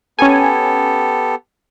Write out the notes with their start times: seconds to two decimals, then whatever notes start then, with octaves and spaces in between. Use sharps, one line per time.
0.19 B3 C#4 G4 A4 G#5